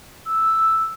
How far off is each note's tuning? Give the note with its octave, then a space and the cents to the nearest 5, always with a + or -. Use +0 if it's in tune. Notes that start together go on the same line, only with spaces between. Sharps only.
E6 +0